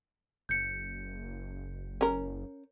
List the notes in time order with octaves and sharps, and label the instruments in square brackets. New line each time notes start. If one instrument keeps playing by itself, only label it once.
[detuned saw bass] F#1 [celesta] G6 C#7
[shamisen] C#4 A#4